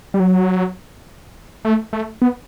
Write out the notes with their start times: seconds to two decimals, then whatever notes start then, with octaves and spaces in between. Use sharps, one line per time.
0.14 G3
0.20 F#3
1.65 A3
1.93 A3
2.22 B3